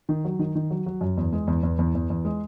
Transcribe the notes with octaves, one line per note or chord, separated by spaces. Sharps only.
D#3
F#3
D#3
D#3
F#3
F#3
F#2
E2
G#3
E2
E2
E2
E2
E2
G#3